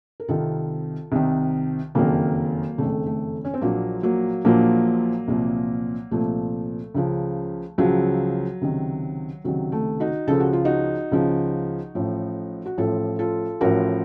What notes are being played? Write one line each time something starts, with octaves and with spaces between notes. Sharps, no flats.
A#4
C2 C3 D#3 F4 A4
C2 C3 D#3
F#1 F2 D#3 F#3 A#3
F#1 F2 D#3 A3
A3
C#4
C4
A#1 A#2 F3 F#3 A#3
F#3 A#3
A#1 A#2 F3 F#3 A#3
C2 A#2 F3
C2 A#2 F3 A3
C#2 C#3 F3
C#2 C#3 F3 F#3
C#2 C3 D#3
C#2 C3 D#3 F#3
A3
D#4 F#4
C#2 C#3 F3 A4
F#4
F4
D#4 F#4
C#2 C#3 F3
A1 A2 F3
F#4
A1 A2 F3 F4 A4
F4 A4
A1 A2 F3 F#4 A#4